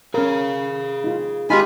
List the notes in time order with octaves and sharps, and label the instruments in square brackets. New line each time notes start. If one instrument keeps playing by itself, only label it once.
[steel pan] C#4 A#4 [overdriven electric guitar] G#4 F5
[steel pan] D#4 F4
[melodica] G#3 F4 B5 [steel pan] D#4 G4 [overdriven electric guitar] G#4 G#5